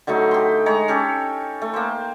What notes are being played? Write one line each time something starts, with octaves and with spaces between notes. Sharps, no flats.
D3 F#3 A3 D#4
G4 C6
G#3 C#5 A#5
C#4 G4 A4 C#5
A3
A#3 C5